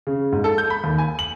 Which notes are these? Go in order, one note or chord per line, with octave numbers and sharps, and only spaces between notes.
C#3
G#2
A4
G6
B5
D#2
G#5
F#7